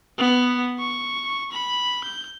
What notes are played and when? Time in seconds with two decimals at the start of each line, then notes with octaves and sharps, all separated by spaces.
0.18 B3
0.80 C#6
1.52 B5
2.04 G6